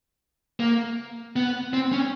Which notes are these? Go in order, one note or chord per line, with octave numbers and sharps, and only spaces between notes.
A#3
B3
C4
C#4